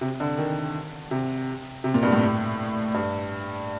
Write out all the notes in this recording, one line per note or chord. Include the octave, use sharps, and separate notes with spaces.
C3
D3
D#3
C3
C3
A#2
G2
A2
G2